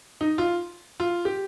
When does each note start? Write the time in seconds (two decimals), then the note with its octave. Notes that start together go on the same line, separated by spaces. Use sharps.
0.21 D#4
0.38 F4
1.00 F4
1.25 G4